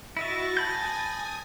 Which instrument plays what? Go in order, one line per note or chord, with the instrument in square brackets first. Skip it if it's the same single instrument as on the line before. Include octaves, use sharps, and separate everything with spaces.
[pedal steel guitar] E4 D#5 E5 [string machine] F#4 C#6 [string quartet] A6 A#6
[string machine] G#5 D#6 [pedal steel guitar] A5 B5 G6